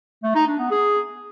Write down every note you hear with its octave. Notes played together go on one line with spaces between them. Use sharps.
A3
D#4
D4
B3
G#4